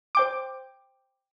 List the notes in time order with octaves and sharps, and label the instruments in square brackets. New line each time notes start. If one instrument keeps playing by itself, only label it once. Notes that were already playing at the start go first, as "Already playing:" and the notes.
[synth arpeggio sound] C5 G5 D6